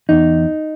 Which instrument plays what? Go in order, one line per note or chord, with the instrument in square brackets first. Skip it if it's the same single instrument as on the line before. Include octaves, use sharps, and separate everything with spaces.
[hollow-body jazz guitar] E2 D#4